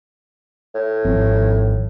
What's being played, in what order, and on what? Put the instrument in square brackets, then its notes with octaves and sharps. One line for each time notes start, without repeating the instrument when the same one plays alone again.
[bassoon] A2
[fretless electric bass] G#1 F3 C4